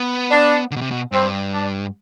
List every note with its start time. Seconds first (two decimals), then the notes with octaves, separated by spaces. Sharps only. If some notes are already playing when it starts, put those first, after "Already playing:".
Already playing: B3
0.30 D4
0.71 D3
0.76 B2
0.81 C3
0.91 B2
1.12 G2 C4
1.52 D4